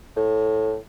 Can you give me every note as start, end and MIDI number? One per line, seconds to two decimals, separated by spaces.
0.16 0.75 45